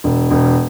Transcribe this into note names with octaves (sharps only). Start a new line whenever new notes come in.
E1
E1